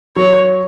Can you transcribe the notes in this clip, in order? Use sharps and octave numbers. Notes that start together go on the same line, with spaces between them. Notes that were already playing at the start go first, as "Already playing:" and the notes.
F#3 C#5